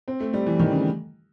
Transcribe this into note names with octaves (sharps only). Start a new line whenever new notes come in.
C4
A3
G3
E3
D#3
C#3